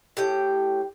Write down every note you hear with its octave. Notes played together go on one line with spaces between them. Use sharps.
A2 G4 G5